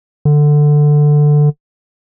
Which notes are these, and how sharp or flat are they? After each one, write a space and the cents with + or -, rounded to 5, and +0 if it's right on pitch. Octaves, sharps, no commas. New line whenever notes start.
D3 +10